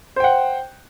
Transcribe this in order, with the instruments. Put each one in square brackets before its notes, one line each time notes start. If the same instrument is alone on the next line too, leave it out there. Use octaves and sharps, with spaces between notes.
[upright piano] C5
G5
F#5